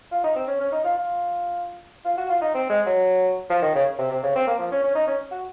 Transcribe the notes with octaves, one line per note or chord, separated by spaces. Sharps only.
F4
D#4
C4
C#4
C#4
D#4
F4
F4
F4
F#4
F4
D#4
C4
G#3
F#3
F3
D#3
C#3
C3
C3
C#3
C4
A#3
F3
C#4
C#4
D#4
C#4
F#4